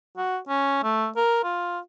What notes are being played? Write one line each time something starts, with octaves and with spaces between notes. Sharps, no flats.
F#4
C#4
A3
A#4
F4